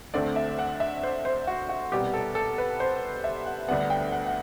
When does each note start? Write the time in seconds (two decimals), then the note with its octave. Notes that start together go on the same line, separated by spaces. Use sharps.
0.14 D2 D3 A3 C4 D5
0.36 E5
0.59 F#5
0.80 E5
1.03 C5
1.25 C5
1.47 F#4
1.69 F#4
1.92 C2 B2 G3 B3 G4
2.14 A4
2.35 A4
2.58 B4
2.80 C5
3.24 E5
3.46 F#5
3.68 D2 D3 G3 B3 F#5
3.90 G5
4.12 F#5
4.26 F#5